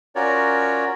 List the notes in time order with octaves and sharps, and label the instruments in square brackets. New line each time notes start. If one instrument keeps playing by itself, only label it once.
[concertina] C#4 F4 F#4 A#4 C#5 D5